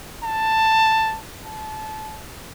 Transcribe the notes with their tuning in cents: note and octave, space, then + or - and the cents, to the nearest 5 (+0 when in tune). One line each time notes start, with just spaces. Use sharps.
A5 +10
A5 -25